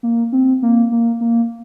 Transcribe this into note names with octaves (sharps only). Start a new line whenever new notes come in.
A#3
C4
A#3
A#3
A#3